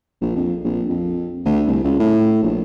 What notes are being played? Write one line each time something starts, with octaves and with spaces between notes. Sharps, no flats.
A#1
F2
A#1
F2
D2
C2
C#2
A2
A#1